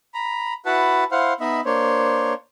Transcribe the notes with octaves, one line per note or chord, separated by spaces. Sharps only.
A#5 B5
E4 F#4 B4 F#5 A5 B5
E4 C5 F5 F#5
B3 D#4 D#5 E5 B5
A#3 D4 C5 C#5